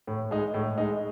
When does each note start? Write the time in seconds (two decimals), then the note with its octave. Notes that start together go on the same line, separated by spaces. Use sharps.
0.07 A2
0.31 G#3 D#4
0.54 A2
0.78 G#3 D#4